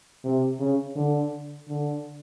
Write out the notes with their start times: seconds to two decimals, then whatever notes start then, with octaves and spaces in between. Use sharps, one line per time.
0.24 C3
0.60 C#3
0.95 D3
1.68 D3